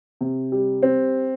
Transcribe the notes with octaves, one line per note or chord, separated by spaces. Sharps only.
C3
G3
C4